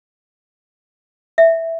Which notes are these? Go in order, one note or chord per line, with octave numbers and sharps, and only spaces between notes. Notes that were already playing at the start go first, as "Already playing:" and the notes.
E5